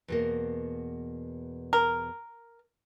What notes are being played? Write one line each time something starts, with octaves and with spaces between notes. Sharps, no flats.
E2 B2 A#3
A#4